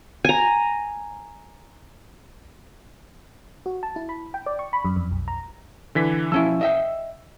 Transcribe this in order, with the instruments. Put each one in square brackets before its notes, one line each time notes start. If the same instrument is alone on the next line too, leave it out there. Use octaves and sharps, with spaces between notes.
[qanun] G#5 A#5
[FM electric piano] F#4
A5
E4
B5
G5
D5
C#6
B5
F#2
F2
B1
A#5
[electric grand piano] D3 E3 B6
[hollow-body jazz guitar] F3 C#4 E4 [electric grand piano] E6
[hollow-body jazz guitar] D#5 E5 G5